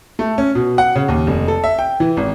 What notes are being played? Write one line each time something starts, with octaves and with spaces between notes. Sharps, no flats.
A3
C#4
B2
F#5
C#3
D#2
F1
A4
E5
G5
E3
G#1